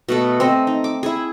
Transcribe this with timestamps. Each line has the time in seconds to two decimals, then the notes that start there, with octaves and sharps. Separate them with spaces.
0.09 B2 A3 A4
0.40 C4 A4 D#5
0.67 D#4
0.84 D6
1.03 E4 G#4